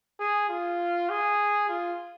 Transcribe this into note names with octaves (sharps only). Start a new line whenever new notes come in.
G#4
F4
G#4
F4